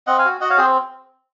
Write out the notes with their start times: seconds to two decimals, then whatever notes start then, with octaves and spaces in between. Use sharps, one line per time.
0.07 C4 D#5 F#5
0.18 F5 G#5
0.25 F#4
0.41 F#4 D#5 F#5
0.50 C#5 F5
0.57 C4 G#4 C5